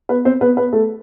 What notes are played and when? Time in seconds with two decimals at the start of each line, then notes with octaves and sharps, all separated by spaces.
0.09 B3 B4
0.25 C4 C5
0.41 B3 B4
0.57 B3 B4
0.73 A3 A4